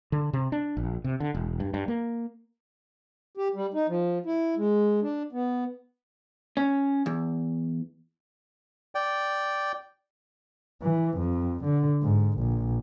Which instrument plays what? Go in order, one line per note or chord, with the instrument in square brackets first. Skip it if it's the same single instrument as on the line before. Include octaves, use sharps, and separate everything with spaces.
[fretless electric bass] D3
C3
D4
A#1
C3
D3
E1
G2
G2
A#3
[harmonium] G4
G3
D#4
F3
E4
G#3
D4
B3
[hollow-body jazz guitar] C#4
E2
[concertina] D5 G5
[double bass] E3
F2
D3
G#2
A#1